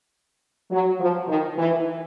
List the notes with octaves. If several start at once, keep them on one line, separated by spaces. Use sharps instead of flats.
F#3
F3
D#3
E3